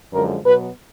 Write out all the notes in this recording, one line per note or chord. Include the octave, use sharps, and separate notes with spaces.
F#2 D3 F3 G#3 A#4
B2 F#3 B3 B4